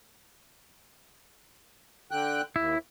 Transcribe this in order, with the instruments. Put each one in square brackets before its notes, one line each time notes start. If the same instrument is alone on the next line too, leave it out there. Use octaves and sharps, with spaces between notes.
[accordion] D3 G5 F#6
[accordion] D#2 [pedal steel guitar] E4